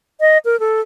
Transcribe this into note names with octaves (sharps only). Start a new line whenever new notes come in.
D#5
A#4
A4